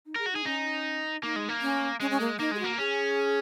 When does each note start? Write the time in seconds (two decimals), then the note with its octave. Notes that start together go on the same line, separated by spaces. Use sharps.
0.06 D#4
0.16 G#4 A#4
0.26 F#4
0.32 D#4 G#4
0.45 C#4 D#4
1.23 A#3 D#4
1.36 G#3
1.49 A#3
1.62 C#4
2.00 G#3 C#4
2.10 C#4
2.20 A#3
2.39 A#3 D#4
2.51 G#3 G#4
2.59 A#3 F#4
2.78 C#4 G#4